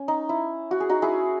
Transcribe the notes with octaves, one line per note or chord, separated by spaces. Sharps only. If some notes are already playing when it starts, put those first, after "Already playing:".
Already playing: C#4
D#4
E4
F#4
G#4
D#4 F#4
E4 G#4